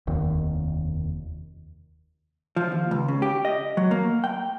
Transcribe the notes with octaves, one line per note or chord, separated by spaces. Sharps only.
F1 D#2 D#3
F3
D#2
C#2
C#3
G4
D#5
F#3
A#3
G5